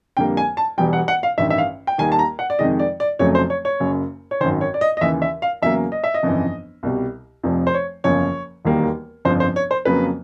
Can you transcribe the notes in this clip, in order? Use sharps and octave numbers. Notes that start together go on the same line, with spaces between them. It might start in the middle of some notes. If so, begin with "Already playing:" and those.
F2 D3 G3 A#3 G5
G#5
A5
E1 E2 B2 G3 G5
F#5
F#5
F5
A1 G2 D#3 E5
E5
F5
G5
D#2 D#3 G3 A#3 G#5
A5
A#5
F#5
D5
F2 C3 D#3 G#3 D#5
D5
D5
F1 F2 C#3 F#3 A3 C#5
C5
C#5
C#5
F#1 F#2 C#3
C#5
G#1 F#2 D#3 C5
C#5
D5
D#5
D#5
D#2 C#3 E3 E5
E5
F5
E2 C#3 F#3 A#3 E5
D#5
E5
D#5
G1 F2 C#3 E3
C2 B2 G3
F1 F2 C3 F3
C5
C#5
F#1 E2 C#3 F3 C#5
E1 D#2 D#3 G3 A#3
G1 F2 C#3 F3 C5
C5
C#5
C5
F2 C#3 F#3 A#3 B4